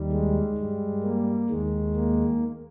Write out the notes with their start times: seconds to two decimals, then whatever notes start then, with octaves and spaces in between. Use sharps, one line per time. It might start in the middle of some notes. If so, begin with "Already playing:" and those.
Already playing: D#2 D#3 G3
0.12 G#3
0.58 G2 G3
1.03 A#3
1.50 D#2 D#3 G#3
1.96 A#3